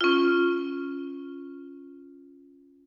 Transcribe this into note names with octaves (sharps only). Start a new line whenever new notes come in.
C#4 F4